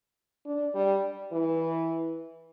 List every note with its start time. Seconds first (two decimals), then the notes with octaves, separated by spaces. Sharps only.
0.46 D4
0.75 G3
1.32 E3